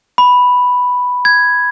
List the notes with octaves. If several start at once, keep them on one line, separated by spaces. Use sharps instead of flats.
B5
G#6